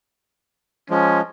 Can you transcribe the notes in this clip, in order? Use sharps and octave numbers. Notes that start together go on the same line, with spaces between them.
F3 G#3 C#4